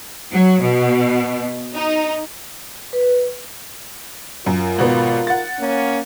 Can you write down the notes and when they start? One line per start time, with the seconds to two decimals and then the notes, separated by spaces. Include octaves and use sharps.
0.33 F#3
0.62 B2
1.74 D#4
2.93 B4
4.46 F#2 F4 A#4
4.78 G#1 B2 B3
5.27 F#5 A6
5.59 A#3 C#4